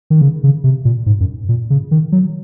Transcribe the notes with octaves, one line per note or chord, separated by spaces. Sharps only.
D#3
C#3
C#3
C3
A#2
G#2
F#2
A#2
C#3
D#3
F#3